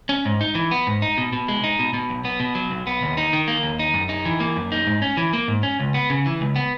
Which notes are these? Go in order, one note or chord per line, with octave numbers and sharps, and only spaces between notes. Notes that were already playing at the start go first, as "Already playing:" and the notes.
C#4
G#2
D#4
E3
B3
G#2
D#4
B2
B2
G#3
D#4
B2
B2
B1
B3
B2
F#3
B1
B3
D#2
D#4
D#3
A#3
D#2
D#4
F#2
D#4
E3
A#3
F#2
D#4
G#2
C#4
E3
A#3
G#2
C#4
C#2
B3
C#3
E3
C#2
B3